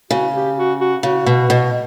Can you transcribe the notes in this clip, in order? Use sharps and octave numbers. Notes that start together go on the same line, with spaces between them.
C#3 F#4
G4
F#4
F#4
C#3 F#4
B2
B2